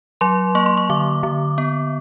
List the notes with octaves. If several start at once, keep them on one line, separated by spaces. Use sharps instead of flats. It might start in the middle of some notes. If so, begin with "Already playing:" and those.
F#3 C6
A#3 C#6
C6
C#6
D3 D6
D3
B3